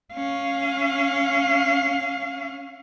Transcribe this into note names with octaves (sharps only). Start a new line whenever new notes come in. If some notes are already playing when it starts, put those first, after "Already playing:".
C#4 F5